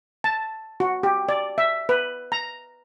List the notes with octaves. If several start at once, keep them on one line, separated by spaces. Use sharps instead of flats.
A5
F#4
G4
D5
E5
B4
A#5